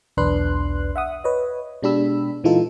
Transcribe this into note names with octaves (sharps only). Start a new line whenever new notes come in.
B1 E2 D4 B4 C6 F#6
E5 F#5 D#6
B4 C#5 D#5
B2 G#3 D4 G4 B5 E6
A#2 E3 G#3 D#4 F4 A4